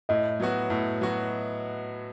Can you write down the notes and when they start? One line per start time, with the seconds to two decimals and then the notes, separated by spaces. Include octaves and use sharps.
0.09 A2 D#5
0.40 F#3 B3 F#4
0.70 A2
1.01 F#3 B3 F#4